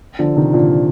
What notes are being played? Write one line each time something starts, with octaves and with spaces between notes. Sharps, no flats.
D3 F3
C3 D#3
A#2 D3